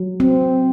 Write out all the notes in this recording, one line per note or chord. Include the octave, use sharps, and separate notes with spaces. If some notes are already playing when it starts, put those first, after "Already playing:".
Already playing: F#3
C4